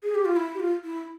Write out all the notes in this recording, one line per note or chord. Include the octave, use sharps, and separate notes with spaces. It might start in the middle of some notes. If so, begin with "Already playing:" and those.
G#4
G4
F4
E4
G4
F4
E4